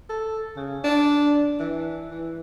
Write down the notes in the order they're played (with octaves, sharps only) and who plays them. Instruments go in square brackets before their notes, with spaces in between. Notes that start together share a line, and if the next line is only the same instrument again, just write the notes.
[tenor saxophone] A4
C#3
D4
E3
E3